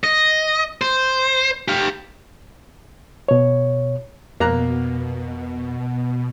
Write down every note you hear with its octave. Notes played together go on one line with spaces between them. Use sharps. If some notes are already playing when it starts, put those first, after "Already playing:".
D#5
C5
G4 F5
B2 C#5
F2 B2 A#3 A#5 F#6